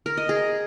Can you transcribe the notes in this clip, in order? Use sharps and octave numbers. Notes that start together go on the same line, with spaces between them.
A#4
D#5
G#4